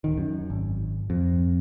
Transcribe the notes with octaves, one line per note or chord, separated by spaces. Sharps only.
D1 D#3
F#2
G#1
F2